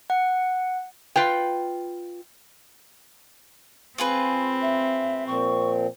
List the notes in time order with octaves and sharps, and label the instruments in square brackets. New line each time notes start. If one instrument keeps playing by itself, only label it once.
[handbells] F#5
[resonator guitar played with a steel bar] F4 B4 G5
[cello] C4 [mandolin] F4 G#4 B4
[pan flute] E5
[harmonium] A#2 F3 C4 [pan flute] C#6